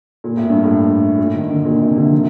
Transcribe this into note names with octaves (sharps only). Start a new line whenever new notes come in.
A#2
A2
G2
A2
A#2
D#3
D3
A#2
C3
D3
F3
D#3